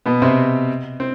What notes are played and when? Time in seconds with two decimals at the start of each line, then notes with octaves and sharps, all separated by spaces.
0.06 B2 B3
0.22 C3 C4
1.00 C4